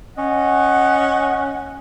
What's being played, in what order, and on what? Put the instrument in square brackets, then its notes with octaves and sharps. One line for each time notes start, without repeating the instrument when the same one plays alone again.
[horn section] C#4 D#5 F#5